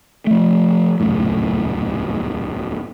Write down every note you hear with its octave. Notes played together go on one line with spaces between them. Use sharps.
F3 A3
D#1 C#2 F#2 A2